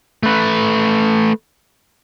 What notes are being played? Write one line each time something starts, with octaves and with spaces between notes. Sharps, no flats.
A3 B4